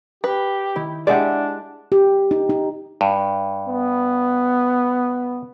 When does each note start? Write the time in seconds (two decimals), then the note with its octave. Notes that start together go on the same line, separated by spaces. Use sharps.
0.24 G4 B4
0.76 D#3 E4
1.07 G#3 D4 G4 G#4 D5 E5 F#5
1.92 G4
2.31 D#4
2.49 D#4
3.01 G2
3.68 B3